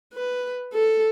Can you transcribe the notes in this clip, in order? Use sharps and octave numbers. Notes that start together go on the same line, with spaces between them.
B4
A4